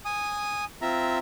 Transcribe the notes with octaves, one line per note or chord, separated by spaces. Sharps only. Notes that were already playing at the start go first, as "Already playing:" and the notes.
G#5 D#6
C4 F4 E5 A#5